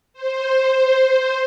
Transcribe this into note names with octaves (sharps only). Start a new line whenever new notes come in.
C5